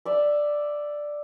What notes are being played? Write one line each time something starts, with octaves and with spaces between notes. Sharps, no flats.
D5 E5